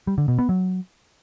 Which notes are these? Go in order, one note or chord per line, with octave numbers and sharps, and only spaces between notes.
G3
D3
B2
B3
F#3